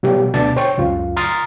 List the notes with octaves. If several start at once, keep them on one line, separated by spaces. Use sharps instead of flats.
B2 F#3 G3 G4
D2 B2 D3 D5 A5 A6
C5 C#5 G5 C#6
C#2 F#2 F4
A#5 C6 D#6 F6 A6